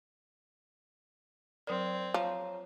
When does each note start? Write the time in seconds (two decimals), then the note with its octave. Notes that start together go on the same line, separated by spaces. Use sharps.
1.67 F#3 C4 A#4 D5
2.14 F3 C#5 A#5